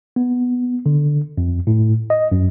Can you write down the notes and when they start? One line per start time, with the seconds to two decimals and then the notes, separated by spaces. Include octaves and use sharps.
0.16 B3
0.86 D3
1.38 F2
1.67 A2
2.10 D#5
2.32 F#2